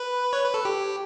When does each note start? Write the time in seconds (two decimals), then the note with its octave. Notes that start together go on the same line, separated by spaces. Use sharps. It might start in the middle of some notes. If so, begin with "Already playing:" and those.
Already playing: B4
0.33 C#5
0.44 B4
0.54 A4
0.65 G4